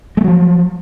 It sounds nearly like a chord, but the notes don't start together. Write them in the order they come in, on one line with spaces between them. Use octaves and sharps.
G#3 A3 F#3 F3